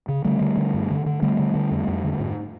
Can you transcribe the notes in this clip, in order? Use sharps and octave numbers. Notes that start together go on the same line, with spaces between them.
C#3
D3 G3 A3
D3
D3
G2
D3
D3
D3 G3 A3
D3
D3
F2
F2
D3
G#2